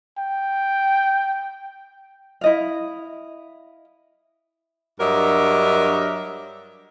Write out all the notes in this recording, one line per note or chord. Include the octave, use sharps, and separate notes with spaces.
G5
E4 D#5 F5
G2 F#3 D4 A#4 D#5 E5